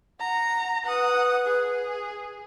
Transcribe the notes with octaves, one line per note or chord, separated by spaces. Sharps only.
F#5 A#5
B4 F#5 D#6
G#4